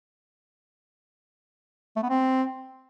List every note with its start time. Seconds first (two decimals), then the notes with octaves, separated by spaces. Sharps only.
1.96 A3
2.03 B3
2.09 C4